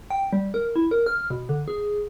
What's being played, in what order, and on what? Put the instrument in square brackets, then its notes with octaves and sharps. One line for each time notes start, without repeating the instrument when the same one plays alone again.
[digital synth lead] G5
G3
A#4
E4
A#4
F6
B2
D3
G#4